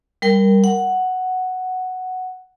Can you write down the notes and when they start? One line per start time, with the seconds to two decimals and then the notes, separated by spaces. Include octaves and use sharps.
0.22 G3 A#4 G5
0.64 F#5